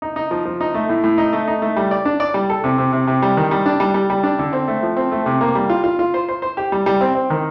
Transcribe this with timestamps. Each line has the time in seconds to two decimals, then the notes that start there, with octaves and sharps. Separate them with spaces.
0.02 D#4
0.16 D#4
0.31 F3
0.45 F3
0.61 D#4
0.74 A3
0.89 A2
1.04 A2
1.18 D#4
1.33 A3
1.48 D#4
1.62 A3
1.76 G3
1.91 D5
2.05 D4
2.20 D5
2.34 G3
2.49 A4
2.64 C3
2.78 C3
2.93 C3
3.07 C3
3.22 G3
3.37 D#3
3.51 G3
3.66 D4
3.80 G3
3.94 G3
4.10 G3
4.23 D4
4.39 D3
4.53 C4
4.68 A3
4.83 F3
4.97 C4
5.12 A3
5.26 C3
5.41 A#3
5.55 G3
5.69 F4
5.84 F4
5.99 F4
6.14 C5
6.28 C5
6.42 C5
6.57 G4
6.72 G3
6.86 G3
7.01 C4
7.15 C4
7.30 D#3